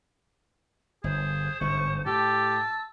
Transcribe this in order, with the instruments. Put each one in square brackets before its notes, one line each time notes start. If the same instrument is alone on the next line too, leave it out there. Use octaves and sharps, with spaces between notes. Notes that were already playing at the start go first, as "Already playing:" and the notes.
[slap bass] G1 [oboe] G#4 [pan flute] C5
[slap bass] G1 G#2 D3 [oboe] C#6
[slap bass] A2 [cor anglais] G4 [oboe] A5 [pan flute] E6